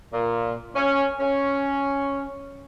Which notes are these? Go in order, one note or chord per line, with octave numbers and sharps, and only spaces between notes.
A#2
C#4
C#4